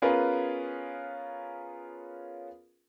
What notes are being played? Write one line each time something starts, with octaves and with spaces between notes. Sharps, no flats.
B3 C#4 F4 G#4 A#4 B4